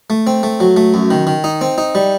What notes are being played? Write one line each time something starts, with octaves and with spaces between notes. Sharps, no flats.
A3
C4
A3
F#3
A3
F#2
D#3
D#3
D#4
C4
D#4
G3